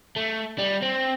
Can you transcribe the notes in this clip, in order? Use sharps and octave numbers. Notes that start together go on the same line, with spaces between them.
A3
G3
C4